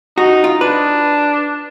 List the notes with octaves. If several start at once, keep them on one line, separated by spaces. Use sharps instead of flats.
D#4 F#4
F4
D4 B4